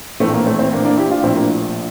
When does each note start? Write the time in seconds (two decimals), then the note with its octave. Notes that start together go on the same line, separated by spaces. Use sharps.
0.20 A#1 A2 E3 A3 C4
0.34 A#3
0.46 A3 C4
0.59 C4 E4
0.72 A#3 D4
0.85 A#3 D4
0.97 E4 G4
1.11 D4 F4
1.23 A#1 A2 F3 C4 E4
1.36 A#3 D4